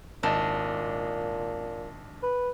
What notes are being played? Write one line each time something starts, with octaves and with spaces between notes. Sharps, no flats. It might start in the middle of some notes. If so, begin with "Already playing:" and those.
G#1 A#2 D4 D#5
B4